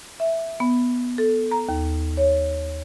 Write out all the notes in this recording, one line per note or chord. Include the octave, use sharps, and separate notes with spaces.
E5
B3
A4
A#5
D#2
C#5